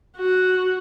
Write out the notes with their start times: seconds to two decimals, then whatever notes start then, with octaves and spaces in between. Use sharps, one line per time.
0.17 F#4